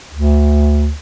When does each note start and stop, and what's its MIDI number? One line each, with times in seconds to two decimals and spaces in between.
0.12 0.92 38